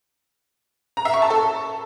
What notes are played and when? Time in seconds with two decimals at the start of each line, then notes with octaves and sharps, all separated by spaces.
0.97 A#5
1.05 E5
1.14 C#6
1.22 A5
1.30 A4